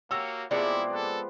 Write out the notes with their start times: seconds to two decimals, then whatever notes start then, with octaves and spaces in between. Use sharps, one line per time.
0.11 A#3 F#4 G4 C#5 E6
0.51 C3 F3 G#3 A#3 B3 E4 D5
0.93 A4 B4